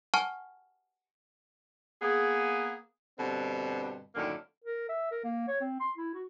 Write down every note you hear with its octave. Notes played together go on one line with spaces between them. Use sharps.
F#5 G#5 A5 C#6 F6
A#3 B3 G#4
G2 B2 D3 C4
F#2 A2 D3 D#3 A#3
A#4
E5
A#4
A#3
C#5
C4
C6
E4
F#4